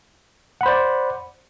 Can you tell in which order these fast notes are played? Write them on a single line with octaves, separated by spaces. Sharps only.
F#5 B5 C5 D5